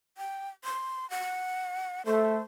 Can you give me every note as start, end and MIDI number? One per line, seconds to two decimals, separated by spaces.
0.18 0.49 79
0.64 1.09 84
1.10 2.02 78
2.06 2.38 57
2.06 2.42 72